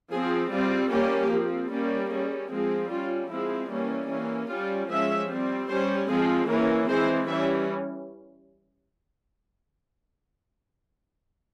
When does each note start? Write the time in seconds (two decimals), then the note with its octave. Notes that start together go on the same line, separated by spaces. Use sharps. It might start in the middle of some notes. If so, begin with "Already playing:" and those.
0.11 F3 C4 G#4
0.51 G3 C4 F4
0.91 G3 A#3 C#4 G4
1.30 F3 C4
1.70 G3 A#3 C#4
2.10 G3 C#4 G#4
2.50 F3 G#3 C4
2.90 G3 C#4 F4
3.30 F3 G#3 C4 E4
3.70 E3 G3 A#3 C#4
4.09 E3 A#3 C#4
4.49 G3 C#4 F4
4.89 F3 G#3 C#4 E5
5.29 G3 C4
5.68 G3 C#4 C5
6.08 F3 G#3 C4 G#4
6.48 E3 A#3 C#4 A#4
6.88 E3 G#3 C4 C5
7.28 E3 G3 C#4 E5